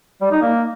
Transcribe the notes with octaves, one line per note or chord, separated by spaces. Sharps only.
G3
D#4
A#3